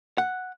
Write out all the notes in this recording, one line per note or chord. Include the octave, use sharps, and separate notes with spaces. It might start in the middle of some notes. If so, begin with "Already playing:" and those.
F#5